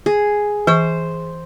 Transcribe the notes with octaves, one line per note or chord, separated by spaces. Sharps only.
G#4
E3 C5 C#6